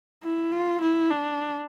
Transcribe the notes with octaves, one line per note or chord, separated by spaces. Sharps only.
E4
F4
E4
D4